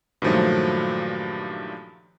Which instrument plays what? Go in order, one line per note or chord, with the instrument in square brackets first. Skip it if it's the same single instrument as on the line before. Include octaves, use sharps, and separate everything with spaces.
[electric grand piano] G2 A#2 D#3 F3 F#3 A3